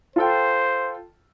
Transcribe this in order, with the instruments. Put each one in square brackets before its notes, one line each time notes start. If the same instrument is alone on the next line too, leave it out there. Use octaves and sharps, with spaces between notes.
[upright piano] F4 A4 G5 [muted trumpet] C5